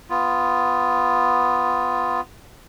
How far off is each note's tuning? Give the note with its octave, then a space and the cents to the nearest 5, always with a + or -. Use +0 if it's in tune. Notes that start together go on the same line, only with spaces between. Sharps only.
B3 +10 F4 +0